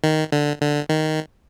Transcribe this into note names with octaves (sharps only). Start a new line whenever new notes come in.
D#3
D3
D3
D#3